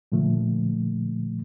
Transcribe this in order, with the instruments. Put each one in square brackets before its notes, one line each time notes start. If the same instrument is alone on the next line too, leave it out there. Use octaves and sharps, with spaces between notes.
[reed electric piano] A#2 D3 F3 A3